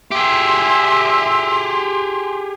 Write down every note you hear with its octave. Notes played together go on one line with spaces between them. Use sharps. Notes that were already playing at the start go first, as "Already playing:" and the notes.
G4 G#4 E5 C6